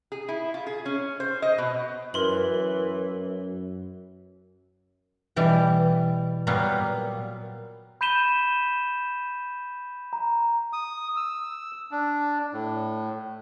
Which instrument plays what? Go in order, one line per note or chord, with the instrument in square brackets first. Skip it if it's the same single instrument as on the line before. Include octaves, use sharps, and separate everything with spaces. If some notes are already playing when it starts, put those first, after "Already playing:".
[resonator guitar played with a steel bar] G#4
E4
F4
G#4
C#4
C5
D#5
B2
[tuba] F#2 [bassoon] E3 [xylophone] A#4 C6 F#7
[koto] B2 E3 G3
A#2 F#3 G3 A#3 B3
[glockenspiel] B5 G6 B6 D#7 E7 G7
A#5
[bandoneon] D#6
E6
D4
A2